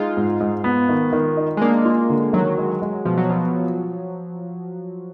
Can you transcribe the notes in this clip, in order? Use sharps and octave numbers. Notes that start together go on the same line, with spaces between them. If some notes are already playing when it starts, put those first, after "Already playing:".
Already playing: G#3 D#4 F4 G#4
G#2
G#2
B3
D#3
D#3
D#4
G#3
A#3 D4
F4
D3
D#3 F#3
G#3
G#3
B2 F3
F#3
F3 B3